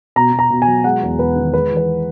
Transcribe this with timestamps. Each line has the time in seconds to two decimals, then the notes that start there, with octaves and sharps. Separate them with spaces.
0.16 B2 A#5
0.33 B2
0.39 A#5
0.50 B2
0.62 G#5
0.67 F#3
0.84 G#3 F#5
1.02 E2
1.19 E2 B4
1.36 D#3
1.54 G#3 B4
1.71 E3
1.77 B4